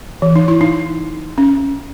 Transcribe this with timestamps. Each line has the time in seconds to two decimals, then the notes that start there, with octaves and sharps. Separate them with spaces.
0.22 E3
0.36 D#4
0.48 E4
0.61 D#4
1.38 C#4